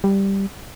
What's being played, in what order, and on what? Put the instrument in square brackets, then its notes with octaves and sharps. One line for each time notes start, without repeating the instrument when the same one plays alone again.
[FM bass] G3